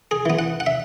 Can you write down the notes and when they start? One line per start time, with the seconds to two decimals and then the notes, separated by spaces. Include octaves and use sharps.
0.11 G#4
0.26 E3 B3
0.39 F#5
0.60 F#5
0.66 E5